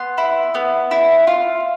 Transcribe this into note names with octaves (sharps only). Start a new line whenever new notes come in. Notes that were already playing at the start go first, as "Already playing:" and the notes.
Already playing: B3 C6
E4
B3
E4
F4